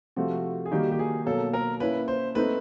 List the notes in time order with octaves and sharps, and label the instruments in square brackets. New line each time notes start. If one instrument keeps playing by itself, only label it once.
[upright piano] C3 F3 A3 [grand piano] F#4
[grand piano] G#4
[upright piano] D#3 G3 A#3 D#4 F#4 [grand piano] G4
[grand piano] G4
G#4
[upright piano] B2 F#3 A#3 [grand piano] A4
[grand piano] A#4
[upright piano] A#3 C#4 E4 [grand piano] B4
[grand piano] C5
[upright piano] A3 C4 D#4 [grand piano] B4